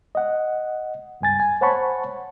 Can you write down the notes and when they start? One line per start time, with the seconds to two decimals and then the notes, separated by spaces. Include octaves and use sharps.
0.15 D#5 F#5
1.21 C#2 G2 G#5 A6
1.40 G#5
1.61 C5 C#5 F#5 A5 B5 C#6